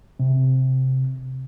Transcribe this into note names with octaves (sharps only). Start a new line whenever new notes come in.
C3